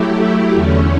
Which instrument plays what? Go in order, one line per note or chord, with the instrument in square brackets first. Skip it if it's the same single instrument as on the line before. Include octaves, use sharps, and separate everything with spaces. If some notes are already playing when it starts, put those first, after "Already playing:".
Already playing: [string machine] F#3 A3 E4 G4
E2 D3 A3 C#4